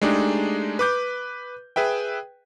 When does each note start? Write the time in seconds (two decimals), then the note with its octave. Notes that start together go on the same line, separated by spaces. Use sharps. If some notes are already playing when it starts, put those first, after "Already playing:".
0.02 G#3 A3 D4 D#4 G4 G#4
0.79 B4 D6 G6
1.76 G#4 B4 E5 G5